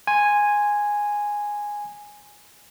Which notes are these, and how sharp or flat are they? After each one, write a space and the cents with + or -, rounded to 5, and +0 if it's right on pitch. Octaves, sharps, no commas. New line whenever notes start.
G#5 -5 C6 +0